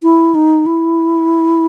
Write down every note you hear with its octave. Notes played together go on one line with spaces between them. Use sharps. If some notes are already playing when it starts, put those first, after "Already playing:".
E4
D#4
E4